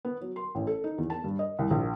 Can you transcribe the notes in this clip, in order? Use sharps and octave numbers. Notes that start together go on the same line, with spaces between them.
B3
F#3
C6
A1
A4
D#4
E2
A5
G2
D#5
C2
A#1